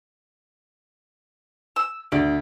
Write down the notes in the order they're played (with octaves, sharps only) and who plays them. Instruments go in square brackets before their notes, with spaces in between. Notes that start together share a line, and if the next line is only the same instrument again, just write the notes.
[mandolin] E6
[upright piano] D2 [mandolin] D5